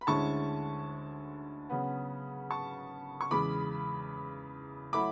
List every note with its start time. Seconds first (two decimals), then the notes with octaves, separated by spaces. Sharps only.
0.01 B5
0.07 D2 D3 G#3 C#4 E4 A5 C#6
1.69 C#3 F#3 B3
2.51 A5 C#6
3.21 C#6
3.31 E2 C#3 G#3 B5 D6
4.93 F#3 A3 E4 B5 D6